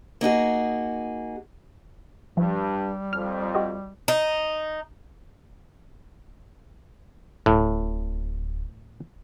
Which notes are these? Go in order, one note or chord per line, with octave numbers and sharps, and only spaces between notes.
A#3 D#4 F#4 G#4
G2 F3 G3
F2 F6
F#4 G4 D#5
D#4
D1 A2